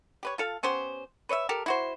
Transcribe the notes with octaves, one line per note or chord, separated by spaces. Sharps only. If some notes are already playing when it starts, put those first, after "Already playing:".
G4 B4 C#5
F4 A4 F5
B3 C#4 G4 C5
B4 C#5 D#5 E5
G4 A4 A#4
E4 F#4 C5